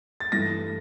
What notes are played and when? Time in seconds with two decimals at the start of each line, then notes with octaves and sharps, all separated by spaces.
0.20 A6
0.32 G2 E3 A3 A#6